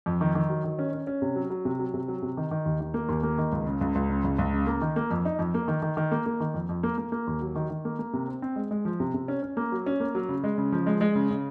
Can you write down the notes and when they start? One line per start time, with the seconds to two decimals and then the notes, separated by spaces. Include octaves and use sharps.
0.06 F2
0.21 D#3
0.35 D#3
0.49 F#3
0.64 D#3
0.79 C#4
0.93 C#4
1.07 C#4
1.22 C3
1.36 F#3
1.50 F#3
1.65 C3
1.79 F#3
1.94 C3
2.08 F#3
2.22 C3
2.37 D#3
2.51 D#3
2.66 D#2
2.80 D#3
2.94 A#3
3.09 D#2
3.23 A#3
3.38 D#3
3.52 C#2
3.67 C#3
3.81 C#2
3.95 C#2
4.10 C#3
4.24 C#2
4.38 C#2
4.53 C#3
4.67 A#3
4.82 D#3
4.96 A#3
5.11 F2
5.25 D#4
5.39 F2
5.54 A#3
5.68 D#3
5.82 D#3
5.97 D#3
6.12 A#3
6.26 A#3
6.40 D#3
6.54 F2
6.69 F2
6.83 A#3
6.98 A#3
7.12 A#3
7.27 D#2
7.41 F#3
7.55 D#3
7.70 D#3
7.85 A#3
7.99 A#3
8.13 C3
8.28 C4
8.42 C4
8.56 G#3
8.71 G#3
8.85 F3
9.00 C3
9.14 C3
9.28 C#4
9.43 C#4
9.57 A#3
9.72 F#3
9.86 C#4
10.00 A#3
10.15 F#3
10.29 C#3
10.44 G#3
10.58 C#3
10.72 F3
10.86 G#3
11.01 G#3
11.15 C#3
11.30 C#3